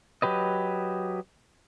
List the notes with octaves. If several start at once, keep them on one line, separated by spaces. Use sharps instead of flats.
F#3 G4 B4 D#5